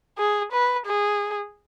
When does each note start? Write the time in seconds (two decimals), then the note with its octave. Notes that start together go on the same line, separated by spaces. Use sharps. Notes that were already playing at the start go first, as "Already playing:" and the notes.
0.18 G#4
0.53 B4
0.86 G#4